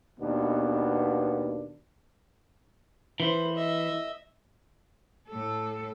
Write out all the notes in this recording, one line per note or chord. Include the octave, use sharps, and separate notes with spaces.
D#2 B2 B3 D4
E3 B4 C5
D#5 E5
A2 A4